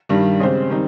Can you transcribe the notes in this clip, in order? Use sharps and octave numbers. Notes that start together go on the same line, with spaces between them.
G2 D#3 G3
C#3 G#3 C4 G4 C5
D#3 G3 C4 D#4